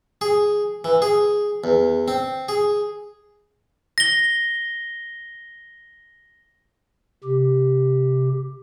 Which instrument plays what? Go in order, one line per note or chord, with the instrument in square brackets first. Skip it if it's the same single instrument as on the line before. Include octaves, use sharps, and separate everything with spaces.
[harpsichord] G#4
E3
G#4
E2
C4
G#4
[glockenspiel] A#6 G7
[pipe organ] C3 G4